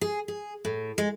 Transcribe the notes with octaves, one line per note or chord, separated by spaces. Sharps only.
G#4
G#4
A2
G#3